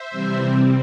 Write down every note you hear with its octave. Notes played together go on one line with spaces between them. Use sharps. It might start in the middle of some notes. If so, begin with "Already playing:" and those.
Already playing: C5 E5
C3 E3 G3 C4
C3 G3 C4